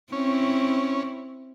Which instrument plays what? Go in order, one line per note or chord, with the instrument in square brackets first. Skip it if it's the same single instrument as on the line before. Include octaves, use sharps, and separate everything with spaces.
[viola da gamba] C4 E4 [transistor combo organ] C#4